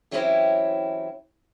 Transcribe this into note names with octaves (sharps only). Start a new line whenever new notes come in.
E3 F#3 C4 C#4 E4 G4